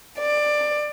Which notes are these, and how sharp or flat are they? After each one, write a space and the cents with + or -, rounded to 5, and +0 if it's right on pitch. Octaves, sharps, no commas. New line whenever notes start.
D5 +15